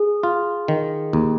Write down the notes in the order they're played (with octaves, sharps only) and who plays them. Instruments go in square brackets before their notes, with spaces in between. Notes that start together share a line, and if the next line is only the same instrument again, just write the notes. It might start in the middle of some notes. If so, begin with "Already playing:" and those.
Already playing: [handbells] G#4
[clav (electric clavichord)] F4
D#3
D#2